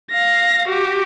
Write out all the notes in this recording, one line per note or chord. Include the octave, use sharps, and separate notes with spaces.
F5 A#6
F#4 G4